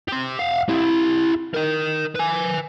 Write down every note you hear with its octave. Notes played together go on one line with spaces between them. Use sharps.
G4 C6
F5 F#5
E4 G4
A#4 D#5
B4 G#5